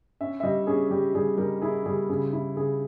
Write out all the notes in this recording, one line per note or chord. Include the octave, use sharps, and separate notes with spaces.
C#4 E5
E5
G3 D#5
C#4 G#4
G3 G4
G3 G#4
G3 A#4
E4 G#4
G3 G#4
C#3 G#4
E4
C#3 G#4